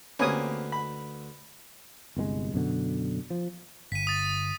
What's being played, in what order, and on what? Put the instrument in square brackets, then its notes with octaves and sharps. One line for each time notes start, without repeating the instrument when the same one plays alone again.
[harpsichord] D2 B4 [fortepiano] A#3 C4 G4 [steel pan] C#4 G#5 D#6
[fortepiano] B5
[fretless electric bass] G1 C2 D3 G#3
F#2 B2 D3
F3
[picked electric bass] G1 [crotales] B6 D#7
[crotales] D#6 A6